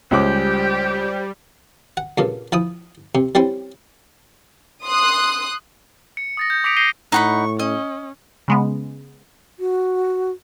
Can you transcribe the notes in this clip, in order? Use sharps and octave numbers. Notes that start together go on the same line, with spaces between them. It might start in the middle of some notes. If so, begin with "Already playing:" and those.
C#2 G3 G4 C5 D6
F#5
G2 A#2 C#3
F3 E4 D#6
C3
G3 C4 C#4 E4
C6 D#6 F#6
C#7
D#6 A6 A#6
G6
D6 D#6 B6 C#7 D7 F7
G6 A#6 C7 D#7 G7
A2 D#4 F#5 B5 C#6
C#4 D#5
C#3 G#3 B3
F#4